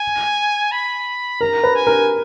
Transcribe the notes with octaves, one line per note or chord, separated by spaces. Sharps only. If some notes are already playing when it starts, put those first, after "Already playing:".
Already playing: G#5
B5
A#4 A#5
B4
G#5
A#4